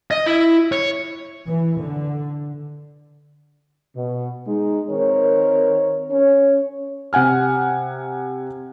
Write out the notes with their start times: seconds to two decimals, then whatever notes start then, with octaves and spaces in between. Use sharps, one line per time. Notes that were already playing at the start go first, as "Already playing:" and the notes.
0.11 D#5
0.26 E4
0.72 C#5
1.48 E3
1.80 D3
3.95 B2
4.47 G#3 D#4
4.89 D#3 C4 A#4 C#5
6.10 C#4 C#5
7.13 C3 F#5 G#5 F6